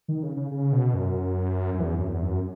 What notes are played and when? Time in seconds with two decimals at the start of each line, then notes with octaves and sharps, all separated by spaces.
0.08 D#3
0.23 C#3
0.37 C#3
0.51 C#3
0.73 B2
0.94 F#2
1.74 F#2
1.80 E2
1.98 F#2
2.08 E2
2.23 F#2